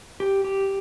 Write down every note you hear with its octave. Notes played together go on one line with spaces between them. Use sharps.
G4
G4